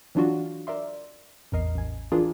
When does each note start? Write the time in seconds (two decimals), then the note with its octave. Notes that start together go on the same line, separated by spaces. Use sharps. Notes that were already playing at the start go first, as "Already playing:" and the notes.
0.15 E3 F#3 D4 F4 F#4
0.67 A#4 D5 E5 C6
1.52 A1 E2 A#4 D#5 C7
1.75 A1 G#5
2.12 E3 D4 F4 G#4 A#4 D5